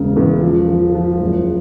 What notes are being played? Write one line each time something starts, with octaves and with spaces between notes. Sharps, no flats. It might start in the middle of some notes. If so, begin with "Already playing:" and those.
Already playing: E1 C#3
E2
F3
F3
F3
F#1